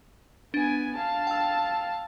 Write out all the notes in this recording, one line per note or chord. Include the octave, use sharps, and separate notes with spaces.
B3 D4 G#5
F5 A5
G5 E6